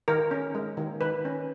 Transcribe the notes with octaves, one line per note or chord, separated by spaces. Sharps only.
D#3 A#4
C#4
G#3
D#3
D#3 B4
C#4